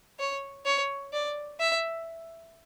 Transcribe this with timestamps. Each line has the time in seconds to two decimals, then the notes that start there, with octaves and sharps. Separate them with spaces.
0.19 C#5
0.65 C#5
1.13 D5
1.60 E5